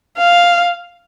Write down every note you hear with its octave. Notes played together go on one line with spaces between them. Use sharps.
F5